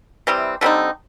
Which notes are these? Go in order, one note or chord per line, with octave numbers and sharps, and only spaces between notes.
C3 E3 G3 C4
D3 G3 C4 D#4